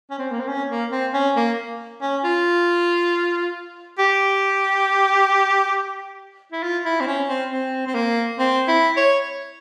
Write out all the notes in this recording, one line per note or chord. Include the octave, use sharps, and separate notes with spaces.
C#4
C4
A#3
C4
C#4
A#3
C4
C#4
A#3
C#4
F4
G4
E4
F4
E4
C4
C#4
C4
C4
C4
A#3
C4
E4
C#5